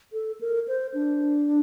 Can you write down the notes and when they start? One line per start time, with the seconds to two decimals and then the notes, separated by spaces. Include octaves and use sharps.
0.13 A4
0.41 A#4
0.68 C5
0.94 D4